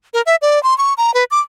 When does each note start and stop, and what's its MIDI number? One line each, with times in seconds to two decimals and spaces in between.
0.14 0.22 70
0.26 0.36 76
0.42 0.61 74
0.63 0.77 84
0.78 0.94 85
0.98 1.14 82
1.14 1.24 71
1.31 1.40 86